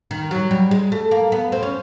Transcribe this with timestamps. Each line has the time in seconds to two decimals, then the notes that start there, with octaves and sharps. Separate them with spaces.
0.11 D#3
0.31 F#3
0.51 G3
0.71 G#3
0.92 A3
1.11 A#3
1.32 B3
1.52 C4
1.63 C#4